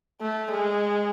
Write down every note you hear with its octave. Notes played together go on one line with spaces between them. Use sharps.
A3
G#3